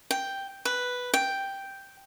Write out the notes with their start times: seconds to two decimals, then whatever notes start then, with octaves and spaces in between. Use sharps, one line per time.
0.11 G5
0.65 B4
1.14 G5